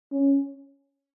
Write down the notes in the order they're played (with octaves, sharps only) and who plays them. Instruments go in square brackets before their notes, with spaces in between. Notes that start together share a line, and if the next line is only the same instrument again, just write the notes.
[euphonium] C#4